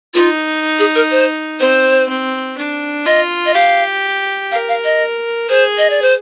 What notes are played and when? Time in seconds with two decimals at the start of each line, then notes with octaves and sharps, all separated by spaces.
0.14 D#4 F4
0.79 G#4
0.95 A#4
1.11 C5
1.60 C4 C5
2.09 C4
2.58 D4
3.06 F4 D#5
3.46 D#5
3.54 G4 F5
4.51 A#4 F5
4.69 F5
4.85 D#5
5.49 G#4 C5
5.78 D#5
5.90 D5
6.02 C5